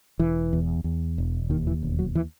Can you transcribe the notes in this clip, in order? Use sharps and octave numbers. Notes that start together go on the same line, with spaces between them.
E1 E3
E2
E2
E1
D#2 D#3
E3
E1
F#3
E3